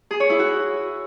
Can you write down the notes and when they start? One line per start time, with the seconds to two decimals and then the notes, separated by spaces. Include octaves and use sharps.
0.11 G#4
0.20 C#5
0.30 E4
0.39 F#4